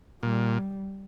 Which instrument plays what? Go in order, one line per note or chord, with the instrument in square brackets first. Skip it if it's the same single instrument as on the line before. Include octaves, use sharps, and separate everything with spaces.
[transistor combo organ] A#2 [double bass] G3